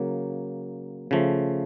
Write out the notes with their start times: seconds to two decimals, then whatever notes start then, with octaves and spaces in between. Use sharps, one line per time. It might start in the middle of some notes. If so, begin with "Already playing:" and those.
Already playing: C#3 F#3 A#3
1.11 C#3 F3 A3